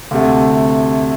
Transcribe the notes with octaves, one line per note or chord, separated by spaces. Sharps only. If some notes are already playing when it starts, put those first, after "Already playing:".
D2 C3 A3